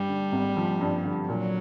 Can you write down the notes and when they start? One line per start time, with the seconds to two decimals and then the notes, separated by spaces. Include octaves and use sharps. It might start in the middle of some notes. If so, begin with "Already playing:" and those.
Already playing: G2 G3
0.08 D3
0.32 G#1
0.57 F3
0.81 G2
1.04 D3
1.28 A#2 F#3